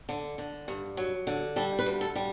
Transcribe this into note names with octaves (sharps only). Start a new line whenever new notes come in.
D3
D3
G2
F#3
D3
G3 A4
B4
D2
A4
G3